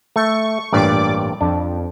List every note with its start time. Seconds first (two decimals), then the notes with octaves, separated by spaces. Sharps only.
0.16 A3 C#6
0.72 A1 G2 A#2 D5 D6
1.41 F2 D4